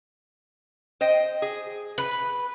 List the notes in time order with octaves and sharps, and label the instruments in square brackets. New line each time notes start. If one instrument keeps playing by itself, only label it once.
[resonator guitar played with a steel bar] C5 D#5 G5
G#4
[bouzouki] B4